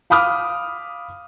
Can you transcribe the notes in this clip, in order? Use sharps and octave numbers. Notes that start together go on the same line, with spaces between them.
F5 B5 D6 D#6 F6